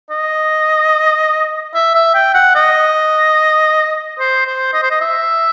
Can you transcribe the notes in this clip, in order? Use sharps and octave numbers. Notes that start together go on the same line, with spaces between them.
D#5
E5
E5
G5
F#5
D#5
C5
C5
D#5
C5
D#5
E5